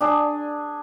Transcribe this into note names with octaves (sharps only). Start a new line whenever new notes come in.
D4 G#4